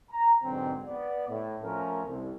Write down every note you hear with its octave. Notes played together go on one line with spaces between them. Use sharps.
A#5
G#2 B2 D3 F#3 C4
B3 D5
A2
F3 A3 C#4 A#4
C2